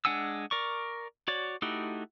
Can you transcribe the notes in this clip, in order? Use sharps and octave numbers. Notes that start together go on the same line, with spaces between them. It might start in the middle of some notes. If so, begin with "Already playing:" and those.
G#3 D4 F#5 G#5 E6
A#4 D5 C#6
F#4 C#5 D5
A3 D#4 E4 F#4 G4